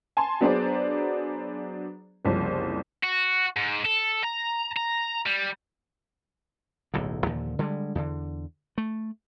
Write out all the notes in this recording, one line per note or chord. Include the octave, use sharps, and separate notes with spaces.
G#5 A5 C6
F#3 B3 D4 G#4 C5 D5
F#1 C2 F3 C5
F#4
G#2
A4
A#5
A#5
G3
D1 B1 A2 D3
D#2 A#2 D3 F3
D3 G3 G#3
E2 D3
A3